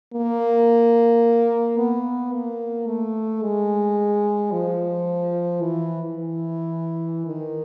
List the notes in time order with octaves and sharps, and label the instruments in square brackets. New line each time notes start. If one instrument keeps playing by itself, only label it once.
[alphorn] A#3
B3
A#3
A3
G#3
F3
E3
E3
D#3